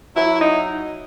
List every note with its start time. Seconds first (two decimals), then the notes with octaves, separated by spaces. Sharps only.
0.15 F#3 E4
0.40 D#4